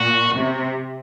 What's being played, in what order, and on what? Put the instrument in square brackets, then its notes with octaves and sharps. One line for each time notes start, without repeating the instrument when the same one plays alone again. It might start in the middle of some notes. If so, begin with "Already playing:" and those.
Already playing: [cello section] A#2 [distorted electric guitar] F#4
[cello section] C3